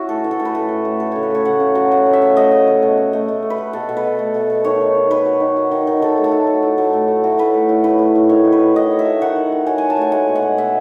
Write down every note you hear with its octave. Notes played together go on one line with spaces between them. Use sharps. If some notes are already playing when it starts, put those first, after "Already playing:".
Already playing: C#4 E4 F#4
A2 A4
E3
A4
A2
B4
A3 A4
A2
A3
F#3 A4
C#3 C#5
B4
A3 C#5
C#3 F#5
C#3
F#3
A3 F#5
C#3
E5
C#3
A3 D#5
C#3
A3
B2
B2
A3
A3
A3
B4
A3
B2 A4
B2
B4
B2
A3
B2
B2
D#3 C#5
D#3
D#3
D#3 B4
F#3
D#3
F#3
D#3
D#3
D#3 A4
A3
A4
F#3
F#3
A2
F#3
A2
A3
F#3
A2 B4
A3
A2
A2 B4
A2
A2
D#3 C#5
D#3
B4
D#3
D#3 D#5
A3
E5
F#3
D#3 F#5
D#3
D#3
F#3 G#5
F#3 G#5
A5
A3 G#5
G#3 G#5
B2
F#5
G#3
B2 E5